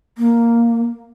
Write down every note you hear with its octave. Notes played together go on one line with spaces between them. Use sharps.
A#3